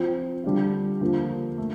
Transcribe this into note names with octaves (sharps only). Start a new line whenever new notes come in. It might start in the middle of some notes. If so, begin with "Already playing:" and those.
Already playing: F3 C4 F4
D3 G3 D4 F4
D3 F3 A#3 F4
A3